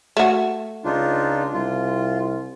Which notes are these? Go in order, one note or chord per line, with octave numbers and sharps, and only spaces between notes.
A3 F#4
C#2 D4 D#4 F4
C2 F4